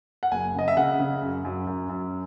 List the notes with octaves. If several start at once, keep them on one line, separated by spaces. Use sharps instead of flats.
F#5
F#1 G#5
C#3 D#5
E5
C#3 F#5
C#3
F#2
F#2
F#2
F#2